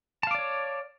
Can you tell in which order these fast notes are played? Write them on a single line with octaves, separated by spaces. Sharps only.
A5 F5 D6 D5 C#5